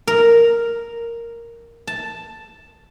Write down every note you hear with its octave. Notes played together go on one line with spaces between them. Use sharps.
A#4
A5